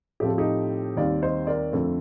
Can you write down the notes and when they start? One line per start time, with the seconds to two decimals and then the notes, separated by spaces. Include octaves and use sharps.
0.20 A2 F3 A3 C4 G4
0.30 A4
0.38 D#4 G4
0.97 D#2 D#3 G3 C4 D5 F5
1.22 C5 D#5
1.47 A#4 D5
1.72 F2 D3 A3 C4